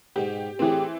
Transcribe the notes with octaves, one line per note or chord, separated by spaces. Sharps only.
G#2 B2 G4
A2 E3 C4 G4 G#4